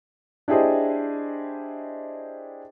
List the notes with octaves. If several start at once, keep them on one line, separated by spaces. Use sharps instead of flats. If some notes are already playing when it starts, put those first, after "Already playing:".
D4 E4 G4 G#4 C5 D#5